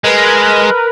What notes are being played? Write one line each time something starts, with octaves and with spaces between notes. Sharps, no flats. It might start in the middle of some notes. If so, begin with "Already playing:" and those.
G#3 A#4 B4